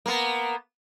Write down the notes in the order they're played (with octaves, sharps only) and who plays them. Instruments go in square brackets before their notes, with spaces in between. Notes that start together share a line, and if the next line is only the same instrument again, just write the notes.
[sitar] A#3 B3